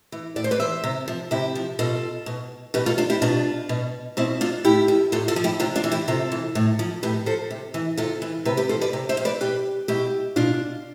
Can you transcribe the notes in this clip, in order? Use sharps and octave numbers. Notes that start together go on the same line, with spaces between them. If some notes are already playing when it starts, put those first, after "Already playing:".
E3
A2 D5
C5
B4 D5
E3 C5 E5
C3
F3
C3 E4 G4
F3
B2 F4 A4
B2
B2 G4 B4
F4 A4
D4 F4
E4 G4
B2 D4 F4
B2
B2 C4 E4
D4 F4
A2 E4 G4
F3
A2 F4 A4
F4 A4
F3
E4 G4
C3 D4 F4
D4 F4
E3
E4 G4
C3 F4 A4
E3
A2
F3
A2 G4 B4
F3 A4 C5
C3
E3
C3 F4 A4
E3
C3 G4 B4
G4 B4
F3 A4 C5
B4 D5
C3
C5 E5
F3
B4 D5
B2 G4 B4
B2 E4 G4
B2 D4 F4